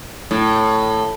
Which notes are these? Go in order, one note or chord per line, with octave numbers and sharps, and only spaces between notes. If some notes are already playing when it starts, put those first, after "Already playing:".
A2